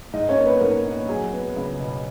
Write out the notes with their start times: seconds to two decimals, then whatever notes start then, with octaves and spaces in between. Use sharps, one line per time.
0.13 G#2 D#4 D#5
0.29 C#4 C#5
0.37 A#3
0.45 B3 B4
0.61 G#2 A#3 A#4
0.85 A#1
1.09 F#3 G#4
1.33 B3
1.56 C#2
1.80 B2